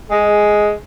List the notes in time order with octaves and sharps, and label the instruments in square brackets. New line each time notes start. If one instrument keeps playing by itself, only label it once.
[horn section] G#3